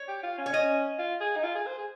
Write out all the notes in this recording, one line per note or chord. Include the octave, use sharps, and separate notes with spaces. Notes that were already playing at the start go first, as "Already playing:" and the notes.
Already playing: C#5
G4
F4
C#4
C#5
C#4 D#5
F4
G#4
D#4
F4
G#4
C5
G#4